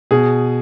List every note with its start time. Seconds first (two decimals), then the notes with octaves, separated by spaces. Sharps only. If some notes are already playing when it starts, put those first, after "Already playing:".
0.11 B2 G#4